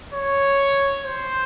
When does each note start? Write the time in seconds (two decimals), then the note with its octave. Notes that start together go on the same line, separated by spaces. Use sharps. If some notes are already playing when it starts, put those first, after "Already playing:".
0.14 C#5
1.03 C5